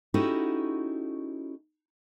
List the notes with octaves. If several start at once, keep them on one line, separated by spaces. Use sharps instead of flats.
C#4 D#4 E4 F#4 G4 A4